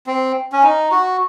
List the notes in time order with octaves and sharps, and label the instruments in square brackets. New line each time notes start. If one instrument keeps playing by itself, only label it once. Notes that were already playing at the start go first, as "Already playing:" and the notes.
[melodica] C4
C#4
D#4
F#4